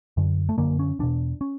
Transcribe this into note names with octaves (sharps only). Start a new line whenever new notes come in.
F#2 D3
A3
F#2 D3 A#3
C#4
E2 B2 D4
C#4